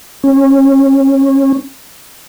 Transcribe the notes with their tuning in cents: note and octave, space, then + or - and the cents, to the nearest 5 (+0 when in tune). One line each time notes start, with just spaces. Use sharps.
C#4 -30